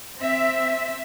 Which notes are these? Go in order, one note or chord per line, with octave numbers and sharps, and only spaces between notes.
C4 E5